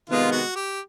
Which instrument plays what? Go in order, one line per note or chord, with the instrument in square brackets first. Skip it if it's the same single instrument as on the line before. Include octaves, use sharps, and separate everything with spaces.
[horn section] C3 D#3 G#3 B3 [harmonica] F4
[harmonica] F#4
G4